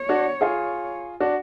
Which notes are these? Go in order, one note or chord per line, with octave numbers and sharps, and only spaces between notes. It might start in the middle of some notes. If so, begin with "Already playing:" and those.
Already playing: C#5
D4 F#4
F4 G#4
D4 F#4